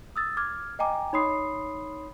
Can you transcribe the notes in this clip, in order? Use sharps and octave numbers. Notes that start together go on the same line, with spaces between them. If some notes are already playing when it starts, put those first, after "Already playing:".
D#6 E6 A6
D6 F6 G#6
D#5 G5 G#5 A#5 D6
D#4 C#5 B5 C6 D#6 C7